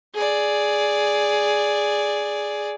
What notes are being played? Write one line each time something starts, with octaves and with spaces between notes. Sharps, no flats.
G#4 D5